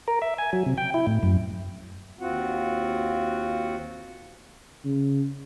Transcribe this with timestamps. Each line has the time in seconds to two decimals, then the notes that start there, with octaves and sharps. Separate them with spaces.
0.08 A#4
0.22 E5
0.38 G#5
0.53 F#3
0.66 C3
0.78 G5
0.94 E4
1.07 A2
1.23 F#2
2.20 D#2 C4 F4 F#4 F#5
4.84 C#3